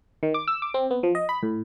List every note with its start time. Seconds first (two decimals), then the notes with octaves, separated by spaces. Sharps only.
0.23 D#3
0.34 D6
0.48 E6
0.62 D6
0.74 C4
0.91 B3
1.03 F3
1.15 D#5
1.29 B5
1.43 A2